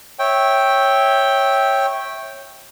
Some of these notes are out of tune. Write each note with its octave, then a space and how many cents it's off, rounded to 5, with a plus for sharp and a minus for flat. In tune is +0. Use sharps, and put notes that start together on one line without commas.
C#5 -15 E5 -15 G5 +0